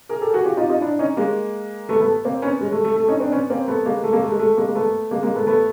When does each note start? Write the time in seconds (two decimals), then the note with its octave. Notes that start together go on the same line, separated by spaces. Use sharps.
0.09 G#4 A#4
0.22 G4 A4
0.33 F#4 G#4
0.46 F4 G4
0.57 D#4 F4
0.69 D#4 F4
0.81 D4 E4
0.99 C#4 D#4
1.17 G#3 A#3
1.89 A3 B3
2.01 A3 B3
2.25 A#3 C4
2.42 B3 C#4
2.61 G#3
2.72 A3
2.84 A3
2.96 A3
3.08 C#4 D#4
3.20 C4 D4
3.32 B3 C#4
3.50 A#3 C4
3.68 A3 B3
3.86 G#3 A#3
4.03 A3
4.13 G#3 A#3
4.22 A3
4.31 G#3
4.39 A3
4.57 G#3 A#3
4.68 A#3
4.75 A3 B3
5.11 G#3 A#3
5.23 G#3 A#3
5.35 A3 B3
5.47 A3 B3